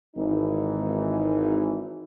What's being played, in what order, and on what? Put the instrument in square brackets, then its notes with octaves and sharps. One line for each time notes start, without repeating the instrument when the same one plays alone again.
[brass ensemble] G#1 E3 D#4